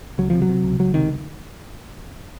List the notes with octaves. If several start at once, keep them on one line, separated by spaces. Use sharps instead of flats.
C#2 F#3
C3 F3
F#3
C3
C#2
C#2 F#3
C3 D#3